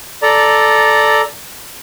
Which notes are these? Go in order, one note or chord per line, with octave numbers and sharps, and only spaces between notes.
A4 D5 A#5